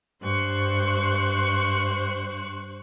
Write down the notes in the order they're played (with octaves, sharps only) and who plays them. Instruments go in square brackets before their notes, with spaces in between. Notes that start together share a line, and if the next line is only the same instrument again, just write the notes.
[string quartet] G2 C5 C#6 F#6